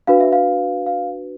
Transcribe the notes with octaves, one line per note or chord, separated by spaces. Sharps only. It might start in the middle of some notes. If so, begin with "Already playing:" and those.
D4 F#4 B4 F5
E5
F5
F5